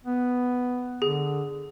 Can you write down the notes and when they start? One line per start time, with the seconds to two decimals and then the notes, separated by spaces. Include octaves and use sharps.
0.04 B3
1.02 D3 G#4